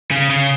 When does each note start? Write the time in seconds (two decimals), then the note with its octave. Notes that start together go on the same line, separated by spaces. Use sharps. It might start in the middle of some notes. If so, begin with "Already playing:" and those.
0.11 C#3
0.30 C#3